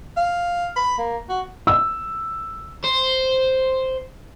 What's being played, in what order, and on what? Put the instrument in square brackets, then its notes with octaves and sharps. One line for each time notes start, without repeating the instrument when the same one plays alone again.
[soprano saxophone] F5
B5
A#3
F#4
[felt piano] E6
[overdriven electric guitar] C5